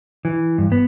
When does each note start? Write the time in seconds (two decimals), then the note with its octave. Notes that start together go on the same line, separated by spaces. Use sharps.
0.25 E3
0.58 G2
0.72 B3